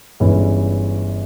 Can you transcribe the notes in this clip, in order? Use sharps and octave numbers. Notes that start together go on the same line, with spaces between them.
G1 G2 E3 G#3 C#4